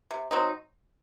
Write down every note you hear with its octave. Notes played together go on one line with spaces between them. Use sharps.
C3
F#3 C4 D#4